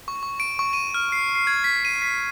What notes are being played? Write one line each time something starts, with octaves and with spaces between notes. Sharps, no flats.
C#6
C#6
D7
C#6
D#7
F6
C7
C7
G#6
B6
D#7
B6